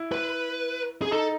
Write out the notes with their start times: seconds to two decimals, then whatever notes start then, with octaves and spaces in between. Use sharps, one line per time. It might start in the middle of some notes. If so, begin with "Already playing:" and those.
Already playing: E4
0.12 B4
1.02 G#4
1.11 D#4 A4